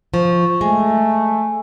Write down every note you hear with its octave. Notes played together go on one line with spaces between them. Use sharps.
F3 C#6
G#3 A3 G#5